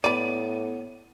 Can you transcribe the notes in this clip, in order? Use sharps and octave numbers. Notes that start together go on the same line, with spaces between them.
A2 B3 B4 D5 D#7